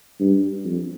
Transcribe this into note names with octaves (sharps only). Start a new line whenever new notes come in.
G2
F2